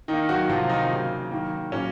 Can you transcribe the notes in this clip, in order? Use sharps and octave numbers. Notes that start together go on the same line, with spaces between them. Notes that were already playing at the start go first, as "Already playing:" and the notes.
D#3 A#3 D#4
F#3 F#4
C3 F3 F#3 A#3 F4
D#3 D#4
C#3 F#3 A#3
D#3 F#3 A#3
A#2 F#3 A#3 C#4